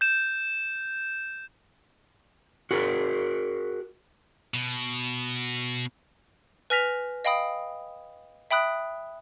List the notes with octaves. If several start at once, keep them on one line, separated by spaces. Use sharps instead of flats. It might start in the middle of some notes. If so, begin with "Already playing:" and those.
G6 E7
F#4 G#4 A#4
B2
B4 G#5 F6 A#6 B6 F7
D#5 F5 G5 B5 D#6
E5 G5 B5 D#6 F#6